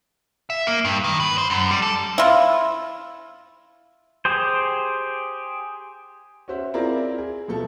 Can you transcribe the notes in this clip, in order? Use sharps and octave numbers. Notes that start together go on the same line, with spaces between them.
E5
A#3
G2
D#3
B4
C5
F#2
G3
A4
E4 F4
G4 G#4 C5
C#4 F#4 C5 E5
C4 E4 F4 G#4 A#4 D5
G#4
B2 F3 A3 A4